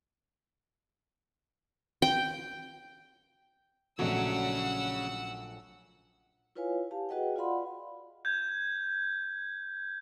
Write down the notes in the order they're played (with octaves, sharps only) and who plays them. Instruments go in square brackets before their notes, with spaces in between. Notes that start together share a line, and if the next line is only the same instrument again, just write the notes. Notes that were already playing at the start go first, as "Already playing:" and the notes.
[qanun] G5
[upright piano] A#1 A3 [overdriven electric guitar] C#3 C#4 [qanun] F#3 [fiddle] F#5 E6
[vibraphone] E4 F4 B4 C#5 F5 G#5
G4 F5 A5
F#4 G#4 B4 D#5 F#5 G5
F4 D5 F5 F#5 B5 C6
[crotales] G6 G#6